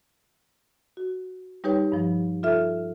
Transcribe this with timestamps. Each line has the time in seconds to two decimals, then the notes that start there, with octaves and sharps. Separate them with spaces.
0.97 F#4
1.64 G3 D#4 G4 B4 C#5 G5
1.92 G2 F3
2.43 F4 A4 E5 F6